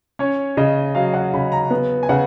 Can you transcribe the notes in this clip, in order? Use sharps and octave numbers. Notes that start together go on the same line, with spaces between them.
C#4 C#5
C#3 D#5
F#3 F5
F#5
C#3 B5
A#5
B3
G#5
C#3 F#5